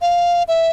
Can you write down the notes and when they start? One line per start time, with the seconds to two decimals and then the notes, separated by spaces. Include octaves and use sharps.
0.01 F5
0.48 E5